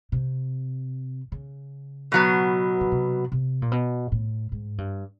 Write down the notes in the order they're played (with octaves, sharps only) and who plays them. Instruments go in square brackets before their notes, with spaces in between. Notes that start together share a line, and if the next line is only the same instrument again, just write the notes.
[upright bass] C3
C#3
[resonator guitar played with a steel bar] B2 F#3 B3
[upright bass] C#3
C3
C3
A#2
B2
A2
G#2
G2